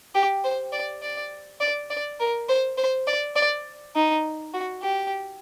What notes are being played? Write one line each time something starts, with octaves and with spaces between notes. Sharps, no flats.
G4
C5
D5
D5
D5
D5
A#4
C5
C5
D5
D5
D#4
F#4
G4